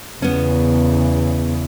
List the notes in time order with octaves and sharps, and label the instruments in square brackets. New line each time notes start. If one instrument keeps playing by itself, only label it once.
[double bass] E2 C#3 [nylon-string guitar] B3 C#4